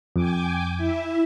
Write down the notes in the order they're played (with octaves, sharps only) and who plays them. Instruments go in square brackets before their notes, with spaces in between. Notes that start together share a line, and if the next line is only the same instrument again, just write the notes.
[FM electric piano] F2 [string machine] G5 G#5 D6
[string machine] E4 E5